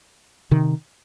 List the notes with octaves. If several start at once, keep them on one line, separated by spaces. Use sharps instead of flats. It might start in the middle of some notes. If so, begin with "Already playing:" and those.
C3 D#3